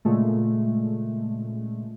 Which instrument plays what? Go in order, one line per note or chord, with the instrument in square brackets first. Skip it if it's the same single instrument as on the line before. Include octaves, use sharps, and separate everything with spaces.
[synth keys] A#2 C#3 G#3 A3